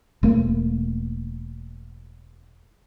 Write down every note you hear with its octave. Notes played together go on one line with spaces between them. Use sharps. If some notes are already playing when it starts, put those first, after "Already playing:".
E1 A3 A#3